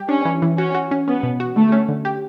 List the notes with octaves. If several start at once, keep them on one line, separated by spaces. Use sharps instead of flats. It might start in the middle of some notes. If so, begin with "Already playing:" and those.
Already playing: G3 G4
C#4 D4
E3
E3
C#4 F#4
F#4
C#4
B3 C#4
B2
F#4
D3 A3
C#4
D3
G4